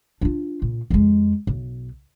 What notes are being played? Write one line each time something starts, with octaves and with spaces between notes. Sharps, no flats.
D4 F4
A#2
F2 G#3
B1